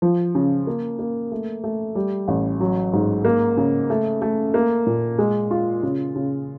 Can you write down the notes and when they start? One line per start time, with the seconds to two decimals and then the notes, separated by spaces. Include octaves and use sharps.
0.02 F3
0.35 C#3
0.67 A#3
0.99 A#3
1.32 A3
1.64 A3
1.95 G3
2.28 A1
2.60 F#3
2.93 G#2
3.25 A#3
3.57 C#3
3.90 A3
4.22 A3
4.54 A#3
4.87 A#2
5.18 G#3
5.51 F4
5.83 C#3
6.15 C#3